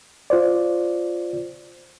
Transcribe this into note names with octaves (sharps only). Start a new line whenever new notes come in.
F4 C5 D5